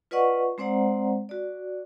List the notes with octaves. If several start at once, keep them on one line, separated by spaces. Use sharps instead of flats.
F4 B4 D5 D#5 F#5 C#6
G#3 C4 C5 D5 F#5 A#5
F#4 D5